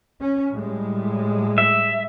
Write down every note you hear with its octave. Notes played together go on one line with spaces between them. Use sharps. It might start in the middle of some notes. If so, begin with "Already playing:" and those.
C#4
A2 G3 G#3
E5